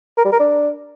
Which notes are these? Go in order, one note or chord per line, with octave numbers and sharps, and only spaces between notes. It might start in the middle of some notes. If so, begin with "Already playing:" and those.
A#4
G3
A#4
D4